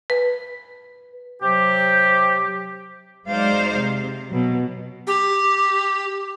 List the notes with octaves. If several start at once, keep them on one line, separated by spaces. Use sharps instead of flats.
B4
C3 F#3 G4
F#3 G#3 D#4 C5 D5 F5
C3
B2 F#3
G4